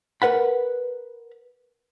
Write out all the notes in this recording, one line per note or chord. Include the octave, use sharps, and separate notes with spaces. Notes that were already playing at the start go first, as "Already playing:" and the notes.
A#4 B4 F#5 B5